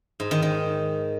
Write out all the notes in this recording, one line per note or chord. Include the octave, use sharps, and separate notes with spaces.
G#2
D#3
D#3